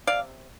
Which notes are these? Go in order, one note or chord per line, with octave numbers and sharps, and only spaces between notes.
C3 D5 F5